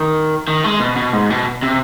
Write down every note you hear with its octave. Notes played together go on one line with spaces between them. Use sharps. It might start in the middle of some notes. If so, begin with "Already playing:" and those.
Already playing: D#3
D#3
G#3
B2
B2
G#2
B2
C3